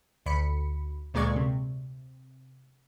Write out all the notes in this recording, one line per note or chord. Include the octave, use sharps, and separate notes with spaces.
D2 B5 C#7
D2 A#2 G#3 D5 C#6 G#6
C3